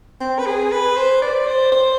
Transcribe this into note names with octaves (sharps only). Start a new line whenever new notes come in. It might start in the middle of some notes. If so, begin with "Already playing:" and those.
C4
B4
G#4
B4
C5
D5
C5
C5